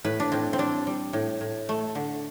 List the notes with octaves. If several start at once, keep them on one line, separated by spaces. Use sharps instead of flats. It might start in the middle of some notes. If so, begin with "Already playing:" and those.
A2 B4
D4
A2 C4
C4
G3 D4
G3
A2
A2
A3
D3